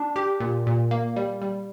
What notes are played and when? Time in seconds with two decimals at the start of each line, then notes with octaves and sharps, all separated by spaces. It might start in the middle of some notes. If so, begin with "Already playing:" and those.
Already playing: D4
0.16 G4
0.40 A#2
0.67 A#2
0.91 A#3
1.16 G3
1.42 G3